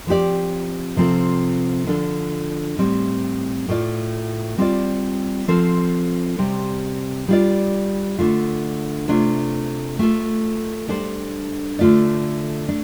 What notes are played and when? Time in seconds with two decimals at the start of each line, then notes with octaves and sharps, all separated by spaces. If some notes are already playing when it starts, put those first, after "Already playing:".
0.07 F3 C4 G4 D5
0.96 C3 F3 C4 F4 A4
1.87 D3 F3 D4 A4
2.77 A2 G3 C4
3.68 A2 A3 F4 D5
4.58 G3 C4 F4 D5
5.48 F3 C4 A4 C5
6.38 C3 G3 C4
7.28 G3 D4 F4 D5
8.19 D3 A3 D4 F4
9.08 C3 A3 D4 F4
9.99 A3 F4 A4
10.88 G3 D4 A4 C5
11.79 D3 A3 F4 D5
12.69 A3 D4